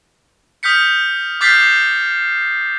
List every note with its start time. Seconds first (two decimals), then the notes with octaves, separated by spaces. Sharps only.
0.63 D#6 F6 G6 B6 C#7
1.41 D6 F6 G6 A6 B6 C7